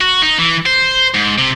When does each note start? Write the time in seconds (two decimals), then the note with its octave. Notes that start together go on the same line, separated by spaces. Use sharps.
0.01 F#4
0.22 D#4
0.39 E3
0.66 C5
1.14 G#2
1.39 C3